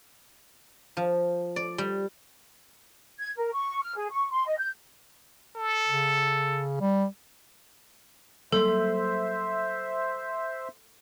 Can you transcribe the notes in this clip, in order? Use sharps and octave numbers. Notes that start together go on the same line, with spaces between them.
F3
D5
G3
G#6
A#4
C#6
F6
G#4
C#6
C6
D#5
G6
A4
C#3
G3
F#3 G3 A#3 A4 C5 E5